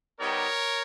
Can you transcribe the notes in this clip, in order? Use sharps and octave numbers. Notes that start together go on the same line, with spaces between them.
G3 B3 D#4 G4 A#4 C#5